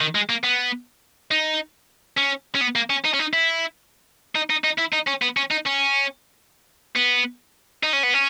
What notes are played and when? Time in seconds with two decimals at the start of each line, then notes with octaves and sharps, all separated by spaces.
0.01 D#3
0.15 G#3
0.29 A#3
0.44 B3
1.31 D#4
2.18 C#4
2.55 C#4
2.61 B3
2.75 A#3
2.90 C#4
3.05 D#4
3.14 C#4
3.19 D#4
3.33 E4
4.35 D#4
4.50 D#4
4.64 D#4
4.78 E4
4.93 D#4
5.08 C#4
5.22 B3
5.37 C#4
5.51 D#4
5.66 C#4
6.96 B3
7.83 D#4
7.93 C#4
8.03 B3
8.14 C#4